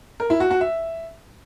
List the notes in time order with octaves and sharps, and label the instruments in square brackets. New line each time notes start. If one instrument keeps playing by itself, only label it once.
[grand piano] A#4
E4
F#4
F#4
E5